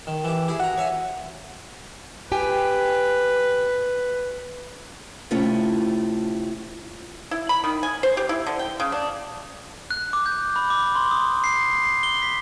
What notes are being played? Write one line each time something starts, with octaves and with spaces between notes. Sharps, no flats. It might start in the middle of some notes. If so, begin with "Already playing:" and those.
D#3
E3 G4
E4 G4 G#4
F#4 F#5 A#5
C#5 E5 G#5
G4 B4 G5 G#5
A2 C3 A3 C#4 E4 F4
E4
B5
D#3
G#5
C5
G4
E4
D3
G5
C#3
D4
F#6
D6
G6
B5
D6
C6
D#6
C7
C7
G7
B6